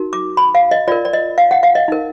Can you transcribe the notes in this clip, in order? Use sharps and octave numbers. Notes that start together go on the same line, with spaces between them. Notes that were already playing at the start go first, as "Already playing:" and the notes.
Already playing: D#4 F#4 A#4
D6
B5
F5
D#5
F4 A#4 D5
D5
D#5
F5
F#5
F5
D#5
D#4 A#4